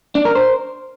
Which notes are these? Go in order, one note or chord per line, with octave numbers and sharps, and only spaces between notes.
D4
A#4
C5